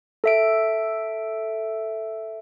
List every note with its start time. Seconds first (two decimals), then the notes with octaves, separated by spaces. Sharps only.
0.24 A4 E5 D7